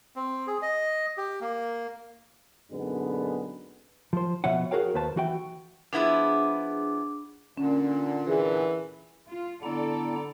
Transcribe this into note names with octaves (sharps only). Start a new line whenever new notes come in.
C4
G#4
D#5
G4
A#3
F#2 A#2 D3 G#3 B3 D#4
F3 C5
B2 F3 C#5 E5 F#5
F#4 G#4 A#4 C#5 F5 G5
D#2 A#3 B4 C5 A5
E3 F#4 G5
F3 B3 D4 E4 G#4 D6
A#2 D3 C#4
E3 G#4
F4
D3 B3 E4 A4 D5 A#5